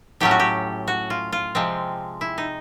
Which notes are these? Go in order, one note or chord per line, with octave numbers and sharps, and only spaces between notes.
A2 F#3 A3 C#4 G4
F#4
G4
F#4
F4
F4
C3 F3 G#3 C4
E4
D#4